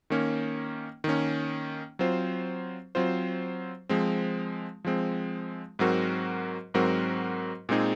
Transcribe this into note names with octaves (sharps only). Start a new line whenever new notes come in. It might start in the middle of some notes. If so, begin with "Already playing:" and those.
D#3 A#3 C#4
D#3 A#3 C#4
F#3 C4 F4 C5
F#3 C4 F4 C5
F3 G#3 C4
F3 G#3 C4
G#2 F#3 C4 F#4 A#4
G#2 F#3 C4 F#4 A#4
A#2 G#3 C4 D#4 G#4